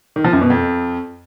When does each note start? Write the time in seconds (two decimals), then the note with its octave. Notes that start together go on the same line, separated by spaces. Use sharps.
0.16 D#3
0.24 F3
0.33 F#2
0.41 B2
0.50 F2